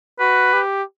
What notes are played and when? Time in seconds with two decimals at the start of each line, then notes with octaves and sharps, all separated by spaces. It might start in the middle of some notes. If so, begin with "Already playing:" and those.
0.20 F#4 B4
0.53 G4